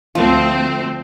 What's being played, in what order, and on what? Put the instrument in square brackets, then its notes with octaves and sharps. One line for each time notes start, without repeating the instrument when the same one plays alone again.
[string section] D2 C4 [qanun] F3